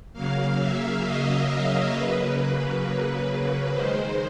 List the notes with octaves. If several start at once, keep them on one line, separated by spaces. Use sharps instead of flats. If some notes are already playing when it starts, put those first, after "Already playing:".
C#3 F#3 A#3 F5
E5
D#5
C#3 F#3 A#3 B4
D#3 G#3 C5